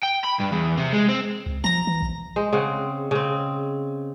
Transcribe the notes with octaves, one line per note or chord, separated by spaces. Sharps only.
G5
B5
G2
E2
C3
G#3
C4
C#2
F3 A#5
E3
B1
G#3 C5
C#3 C4 F#5
C#3 C4